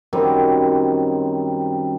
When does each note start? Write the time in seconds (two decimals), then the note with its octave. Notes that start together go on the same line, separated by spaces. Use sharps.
0.13 F#2 D#3 G3 C4